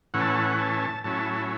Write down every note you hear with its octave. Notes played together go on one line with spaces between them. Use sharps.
A2 E3 C#4 F#5
A5
F#5
A5
F#5
A5
A2 F#3 C#4 E4 A5
A5